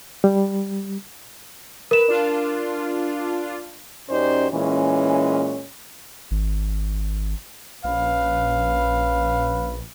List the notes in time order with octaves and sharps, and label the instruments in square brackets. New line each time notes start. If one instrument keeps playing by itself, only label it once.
[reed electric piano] G3
[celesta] A#4 E7 [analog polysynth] B4
[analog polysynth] D4 F4
[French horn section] F#2 C#4 D#4 G4 C5 D5
A#2 E3 G#3 C#4
[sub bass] G#1
[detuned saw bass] A#1 [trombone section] C#4 B4 [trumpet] F5